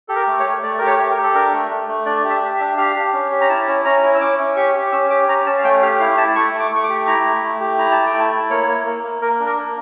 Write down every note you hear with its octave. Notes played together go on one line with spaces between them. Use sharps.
G4 A4
A#4
A3
C#5
A3
A3 D5
G4 A#4
C#5
G4
A#4
G4
A4
D4 A#4
A3
A3
A3
D4 D5
G4
E5
G4
E5
D4
G4 F5
G4
C#4
G4
A#5
E4 A5
C#4
C#4 A#5
E4
E6
C#4 D6
C#4
G4 C#6
G4
C#4 E6
G4 D6
C#4 A#5
C#4 A5
F5
A3 G5
G4 F5
E4 F5
E4 A5
A3 C#6
A3
D6
A3 C#6
D6
G4
E4 A#5
A3
A3
G4
E4 A#5
A3 A5
G5
E4
A5
E4
A#3 C#5
A#3
A#3
A#3
A#3 A#4
D4
A#4
A#3